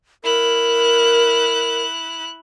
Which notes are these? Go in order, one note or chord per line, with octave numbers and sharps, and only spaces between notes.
E4 A#4 F#6